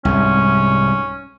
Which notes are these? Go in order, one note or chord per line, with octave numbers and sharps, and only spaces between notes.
C2 G#2 C#4